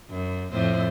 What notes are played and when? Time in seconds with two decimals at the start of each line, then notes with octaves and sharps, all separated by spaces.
0.10 F#2
0.52 F2 A2 C5